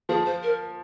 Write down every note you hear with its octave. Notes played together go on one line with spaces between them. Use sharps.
F3 G#4
C5
A#4